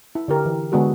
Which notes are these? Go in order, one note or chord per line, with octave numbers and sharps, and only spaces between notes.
E4
D3 G4 A#4
E3
D3 G#3 B3 F#4 G#4 A4